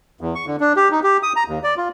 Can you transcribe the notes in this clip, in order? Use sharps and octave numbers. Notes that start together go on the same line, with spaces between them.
E2
C#6
D3
D4
G4
D#4
G4
D#6
A#5
D#2
D5
F4